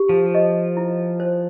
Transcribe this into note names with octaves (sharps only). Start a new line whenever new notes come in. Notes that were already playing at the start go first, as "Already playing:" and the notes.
Already playing: G4
F3
D#5
E4
C5